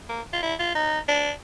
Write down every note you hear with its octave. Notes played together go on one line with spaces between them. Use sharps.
A#3
F4
E4
F4
D#4
D4